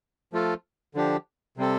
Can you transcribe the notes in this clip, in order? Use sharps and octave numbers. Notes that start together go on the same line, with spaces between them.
F3 A3 F4 A4
D3 F3 D4 G4
C3 G3 C4 A4